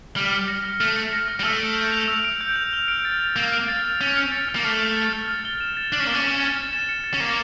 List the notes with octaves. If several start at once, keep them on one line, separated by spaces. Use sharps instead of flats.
G3 F6
C#7
A#6
F6
A3 F6
C#7
A#6
F6
G3
A3 E6
D7
G6
F7
E6
D7
G6
F7
F6
D7
A6
F7
A#3 F6
D7
A6
F7
C#4 F6
C#7
A6
F6
A#3
A3 F6
C#7
A6
F6
A6
G7
E7
A6
D4 A6
C#4
A#3 G7
C#4
E7
A6
A6
E7
C#7
A6
C#4
A#3 A6